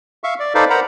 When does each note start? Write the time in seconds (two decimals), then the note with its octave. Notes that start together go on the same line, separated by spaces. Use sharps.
0.24 E5 F5 C#6
0.40 D5
0.55 D#4 A4 B4 C5 D5 F5
0.70 A#4 C5 F#5 A#5 B5